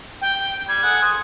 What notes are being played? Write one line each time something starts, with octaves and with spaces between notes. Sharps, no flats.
G5
G3 G#6
G#4 A4 F#5
C5 D#6